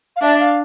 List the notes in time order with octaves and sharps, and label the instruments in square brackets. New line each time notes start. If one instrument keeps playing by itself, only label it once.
[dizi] F5
[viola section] D4 [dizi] E5
[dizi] F5